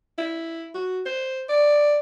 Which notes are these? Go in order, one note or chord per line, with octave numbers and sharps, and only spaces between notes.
E4
F#4
C5
D5